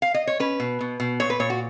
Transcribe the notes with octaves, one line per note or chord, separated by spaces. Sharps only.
F5
D#5
C#5
C#4 B4
B2
B2
B2
A#2 C#5
B4
A#2 C#5
F#4